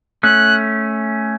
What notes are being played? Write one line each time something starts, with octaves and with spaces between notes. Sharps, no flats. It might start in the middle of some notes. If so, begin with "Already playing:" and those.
A3 C#4 F#6